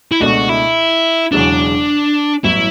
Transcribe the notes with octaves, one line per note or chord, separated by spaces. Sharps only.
E4
C#2 B2 A3 D4 F#4
E4
E1 E2 C#3 F#3 D4
A1 G2 F#3 B3 E4